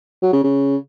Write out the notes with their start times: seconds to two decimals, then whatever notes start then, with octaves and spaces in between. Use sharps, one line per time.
0.22 F#3
0.33 C#3
0.44 C#3